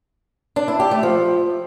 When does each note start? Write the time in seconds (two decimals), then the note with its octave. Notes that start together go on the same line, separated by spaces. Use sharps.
0.56 D4
0.68 E4
0.80 G4
0.91 A3
1.03 F3